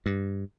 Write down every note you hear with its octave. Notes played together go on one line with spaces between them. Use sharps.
G2